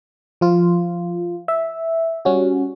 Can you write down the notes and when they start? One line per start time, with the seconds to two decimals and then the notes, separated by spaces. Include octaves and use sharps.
0.41 F3 F4
1.48 E5
2.25 G3 C#4 F#4